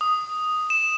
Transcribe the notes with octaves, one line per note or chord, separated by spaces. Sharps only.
D#6
E7